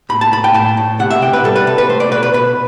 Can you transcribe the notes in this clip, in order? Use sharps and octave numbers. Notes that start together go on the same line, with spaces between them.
A2 B5
A5
A2 B5
G5
A2 A5
A2
C3 F#5
E5
C3 G5
B4
G3 A4
B4
C3 A4
B4
A3 C5
D5
B2 B4
B4
B2 B4